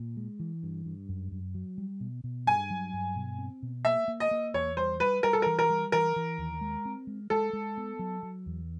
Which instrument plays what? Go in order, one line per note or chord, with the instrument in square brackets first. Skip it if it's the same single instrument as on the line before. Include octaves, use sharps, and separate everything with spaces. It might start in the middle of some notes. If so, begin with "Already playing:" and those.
Already playing: [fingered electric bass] A#2
G#3
E3
G2
G2
F#2
F#2
F#3
G3
B2
B2
[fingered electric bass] G2 [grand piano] G#5
[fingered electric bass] F#3
G2
B2
C4
B2
[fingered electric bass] A#3 [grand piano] E5
[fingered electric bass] A#3
[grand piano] D#5
[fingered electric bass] A#3
[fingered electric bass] E2 [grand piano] C#5
[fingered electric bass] G3 [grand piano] C5
[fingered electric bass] G3 [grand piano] B4
[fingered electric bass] G3 [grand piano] A#4
[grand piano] A4
[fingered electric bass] E3 [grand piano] A#4
[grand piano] A#4
[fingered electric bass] G3
[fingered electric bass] E3 [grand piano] A#4
[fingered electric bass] E3
D#2
G#3
C4
G#3
[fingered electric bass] G#3 [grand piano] A4
[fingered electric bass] G#3
B3
F#3
F#3
E2